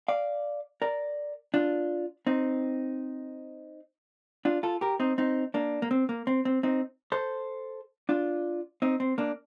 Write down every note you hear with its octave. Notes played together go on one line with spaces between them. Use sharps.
D5 F5
A#4 D5
D4 F4
C4 D#4
D4 F4
F4 A4
G4 A#4
C4 D#4
C4 D#4
A#3 D4
A#3
C4
A#3
C4
C4
C4 D#4
A4 C5
D4 F4
C4 D#4
C4
A#3 D4